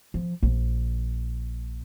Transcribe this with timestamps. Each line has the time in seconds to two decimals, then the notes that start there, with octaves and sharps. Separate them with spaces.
0.14 F3
0.43 A#1